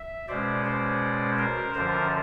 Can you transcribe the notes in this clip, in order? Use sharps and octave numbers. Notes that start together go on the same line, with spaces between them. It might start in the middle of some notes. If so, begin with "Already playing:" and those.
Already playing: E5
B2 G#3 C#4 C5 D5
C5 D5
A#4 C5
F#2 D3 F3 A#4 C5